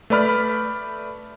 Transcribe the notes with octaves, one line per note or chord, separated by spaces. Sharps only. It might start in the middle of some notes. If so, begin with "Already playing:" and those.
A3 B4 D5 B5 F6